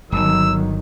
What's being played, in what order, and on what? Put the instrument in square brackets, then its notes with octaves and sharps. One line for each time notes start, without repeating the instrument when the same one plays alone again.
[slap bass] D1 G1 [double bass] D#3 F#3 [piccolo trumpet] E6